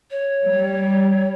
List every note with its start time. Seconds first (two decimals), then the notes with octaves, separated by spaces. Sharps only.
0.11 C#5
0.45 G3